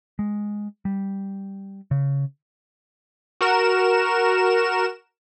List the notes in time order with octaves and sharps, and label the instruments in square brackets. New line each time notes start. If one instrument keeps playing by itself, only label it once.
[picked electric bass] G#3
G3
C#3
[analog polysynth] F#4 A#4 E7